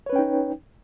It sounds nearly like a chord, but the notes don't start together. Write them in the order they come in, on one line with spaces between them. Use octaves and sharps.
C#5 B4 C#4 G5 D#4